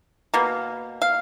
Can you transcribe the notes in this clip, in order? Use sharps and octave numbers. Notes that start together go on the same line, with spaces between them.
B2 A#3
F5